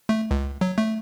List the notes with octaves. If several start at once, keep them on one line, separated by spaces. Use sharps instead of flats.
A3
C#2
F#3
A3